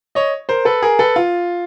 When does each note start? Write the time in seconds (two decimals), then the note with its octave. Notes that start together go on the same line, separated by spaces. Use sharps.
0.15 C#5 D#5
0.49 A#4 C5
0.65 A4 B4
0.82 G#4 A#4
0.99 A4 B4
1.16 F4